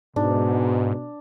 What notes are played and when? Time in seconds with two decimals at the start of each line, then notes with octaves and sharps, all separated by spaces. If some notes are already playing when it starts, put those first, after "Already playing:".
0.16 G#2 B2 D4